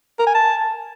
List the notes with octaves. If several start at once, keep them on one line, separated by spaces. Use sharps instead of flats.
A#4
G#5
A5